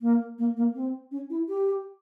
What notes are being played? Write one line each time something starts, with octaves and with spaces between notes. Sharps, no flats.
A#3
A#3
A#3
C4
C#4
E4
G4